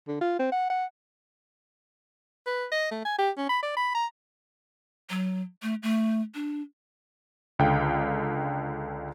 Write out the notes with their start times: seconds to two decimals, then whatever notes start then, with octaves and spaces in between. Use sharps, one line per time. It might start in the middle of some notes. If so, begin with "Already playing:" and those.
0.08 D3
0.21 F4
0.39 C4
0.52 F#5
0.70 F#5
2.46 B4
2.72 D#5
2.91 A3
3.05 G#5
3.18 G4
3.38 C#4
3.49 B5
3.63 D5
3.77 B5
3.95 A#5
5.10 F#3
5.62 A3
5.83 A3
6.35 D4
7.59 C#2 D3 F5 G5